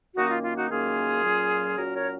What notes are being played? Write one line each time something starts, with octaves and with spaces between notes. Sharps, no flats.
F#2 D#3 A#3 C#4 D#4 F#4
F4
F4
D#4 F#4
F#2 D#3 A#3 C#4 F4 G#4
A#2 F#3 C#4
A#2 F#3 C#4 F#4 A#4
A#4 C#5